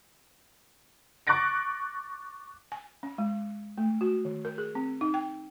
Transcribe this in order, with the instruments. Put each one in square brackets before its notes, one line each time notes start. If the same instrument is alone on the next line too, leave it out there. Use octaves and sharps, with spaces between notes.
[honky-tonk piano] C#6 D6 F#6 A6 A#6 D7
[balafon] G#5
C#4
G#3
A3
F#4
D#3
A#4
G#4
C4
D#4
G5